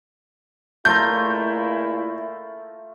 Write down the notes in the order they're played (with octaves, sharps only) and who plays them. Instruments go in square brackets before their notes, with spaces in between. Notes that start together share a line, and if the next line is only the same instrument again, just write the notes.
[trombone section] C#2 A#2 E4 [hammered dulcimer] A3 F4 A#5 [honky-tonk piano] G6